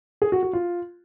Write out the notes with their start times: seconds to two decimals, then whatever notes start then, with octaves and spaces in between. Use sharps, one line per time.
0.22 G#4
0.32 F#4
0.43 F#4
0.53 F4